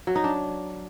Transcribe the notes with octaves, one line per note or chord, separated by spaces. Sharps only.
F#3
D#4
D4